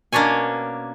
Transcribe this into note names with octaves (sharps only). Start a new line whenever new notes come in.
B2 A#3 C#4 D4 C#5 G#5